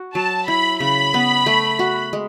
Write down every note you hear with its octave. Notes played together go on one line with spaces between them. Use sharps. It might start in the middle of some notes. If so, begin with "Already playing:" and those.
Already playing: F#4
F#3 A5
E4 B5
C#3 B5
B3
A3
F#4
G#3